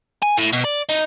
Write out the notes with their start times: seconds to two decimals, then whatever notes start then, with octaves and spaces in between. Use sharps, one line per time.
0.22 G#5
0.38 A2
0.53 B2
0.64 D5
0.89 D#4